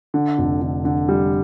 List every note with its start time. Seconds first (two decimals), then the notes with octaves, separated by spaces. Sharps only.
0.14 D3
0.38 F1
0.62 D3
0.85 D3
1.09 G3